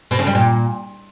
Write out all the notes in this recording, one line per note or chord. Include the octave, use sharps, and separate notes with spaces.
B2
C#3
G3
A#2